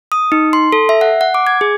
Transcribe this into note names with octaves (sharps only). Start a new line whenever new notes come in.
D#6
D#4
C6
A4
E5
F#5
F#5
D6
G#6
G#4